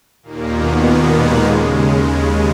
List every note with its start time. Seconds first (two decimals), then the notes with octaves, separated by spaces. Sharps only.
0.23 D#2 A#2 D#3 A#3
0.54 B2 B3
0.83 A#2 A#3
1.15 G#3
1.45 D#2 C#3
2.06 G#3